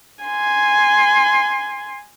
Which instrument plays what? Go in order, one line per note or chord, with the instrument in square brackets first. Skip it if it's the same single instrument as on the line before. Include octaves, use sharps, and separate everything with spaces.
[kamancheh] G#5 C6